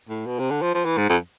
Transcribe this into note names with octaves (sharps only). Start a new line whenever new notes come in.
A2
B2
C3
D3
F3
F3
E3
G#2
F2